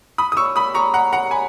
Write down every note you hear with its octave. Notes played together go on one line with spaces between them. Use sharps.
B5 D#6
D#6
C#6 E6
B5 D#6
A#5 C#6
F#5 A#5
F#5 A#5
G#5 B5